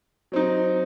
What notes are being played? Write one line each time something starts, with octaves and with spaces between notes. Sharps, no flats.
F#3 C4 D#4